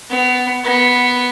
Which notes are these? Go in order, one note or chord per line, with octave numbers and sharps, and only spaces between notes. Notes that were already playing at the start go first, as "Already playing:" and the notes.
B3
B3